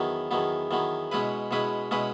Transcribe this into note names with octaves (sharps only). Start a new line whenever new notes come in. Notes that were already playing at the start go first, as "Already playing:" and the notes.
Already playing: E2 D#3 F#3 B3
E2 D#3 F#3 B3
E2 D#3 F#3 B3
B2 G#3 C#4 E4 B4
B2 G#3 C#4 E4 B4
B2 G#3 C#4 E4 B4